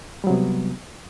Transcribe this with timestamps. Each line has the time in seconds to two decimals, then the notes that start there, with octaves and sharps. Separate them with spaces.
0.24 G3
0.27 F#3
0.30 C3
0.33 B3